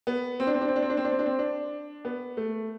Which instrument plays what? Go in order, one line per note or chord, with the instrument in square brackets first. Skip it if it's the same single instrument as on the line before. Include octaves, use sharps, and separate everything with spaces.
[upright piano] B3
C4
D4
C4
D4
C4
D4
C4
D4
C4
D4
C4
D4
C4
D4
B3
A3